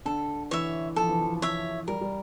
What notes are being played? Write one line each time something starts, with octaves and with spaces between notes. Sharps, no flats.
D3 A4
E3 C#5 E5
F3 A4
E3
F3
C#5 E5
G3 A#4
G3